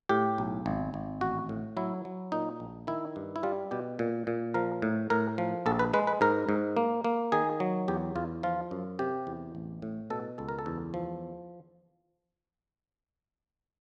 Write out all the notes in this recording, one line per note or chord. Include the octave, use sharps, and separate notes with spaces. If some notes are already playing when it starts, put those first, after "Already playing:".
A2 G4
B1
G#1
G#1
A1 F#4
A2
F#3 E4
F#3
A#2 D#4
A#1
D#3 E4
G2
E4
G3 F4
B2 G4
A#2
A#2
F3 A#4
A2
A2 A#4
F3
A#1 A4
B4
G#3 B4
B4
G#2 A#4
G#2
A#3
A#3
D#3 G#4
F#3
E2 G4
E2 F4
F3 F4
F#2
C3 G4
E2
A1
A2
B2 A4
C#2 A4
A#4
A4
E2
F3